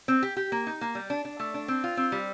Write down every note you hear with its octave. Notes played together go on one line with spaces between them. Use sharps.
C4
G4
G4
A#3
D#4
A#3
G3
D4
D4
A3
D4
C4
F4
C4
G3